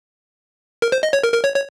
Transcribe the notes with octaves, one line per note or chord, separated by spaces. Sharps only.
A#4
C5
D#5
C#5
A#4
A#4
C#5
C#5